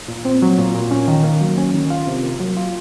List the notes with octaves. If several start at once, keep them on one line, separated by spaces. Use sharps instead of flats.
A#2
C4
F#3
A#2
A#2
C#4
D#3
A#3
F#3
C#4
D#3
F4
C3
A#3
F#3
F4